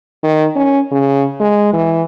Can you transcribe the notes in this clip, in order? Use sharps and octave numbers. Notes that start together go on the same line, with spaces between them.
D#3
C#4
C#3
G#3
E3